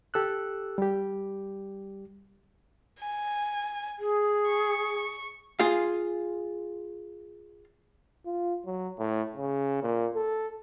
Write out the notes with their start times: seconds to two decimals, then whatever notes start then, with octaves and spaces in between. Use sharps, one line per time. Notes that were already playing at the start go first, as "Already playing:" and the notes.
0.14 G4 A4 E6 F#6
0.78 G3 G4
2.99 G#5
3.99 G#4
4.46 C#6
5.60 F4 G#4 F5
8.25 F4
8.66 F#3
8.99 A2
9.36 C#3
9.83 A#2
10.15 A4